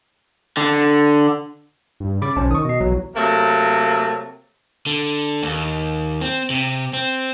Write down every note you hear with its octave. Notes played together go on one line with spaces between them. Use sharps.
D3
G2
C#3 B5 D6 A6
B1 C#4 C5 A5
D#3 C#6 D#6
B2 D#5 C7
B1 E3 F#3
C3 F#3 A3 A#3
D3
D#2
C4
C3
C4